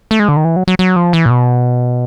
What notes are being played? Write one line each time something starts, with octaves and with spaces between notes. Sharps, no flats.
A3
G#3
D3
D#3
E3
F#3
F#3
F#3
F3
E3
A#2
B2